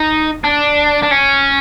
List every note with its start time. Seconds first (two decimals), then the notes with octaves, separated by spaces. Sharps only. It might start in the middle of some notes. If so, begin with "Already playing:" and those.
Already playing: D#4
0.44 D4
1.03 D4
1.11 C#4